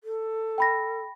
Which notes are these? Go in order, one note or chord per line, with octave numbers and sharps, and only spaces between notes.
A4
G5 B5 A#6